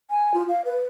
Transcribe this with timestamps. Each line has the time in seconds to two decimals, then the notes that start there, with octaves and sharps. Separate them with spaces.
0.10 G#5
0.34 F4
0.49 F5
0.65 B4